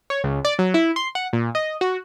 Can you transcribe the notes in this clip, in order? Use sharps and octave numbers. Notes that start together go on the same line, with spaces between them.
C#5
C#2
D5
F#3
E4
C6
F#5
A#2
D#5
F#4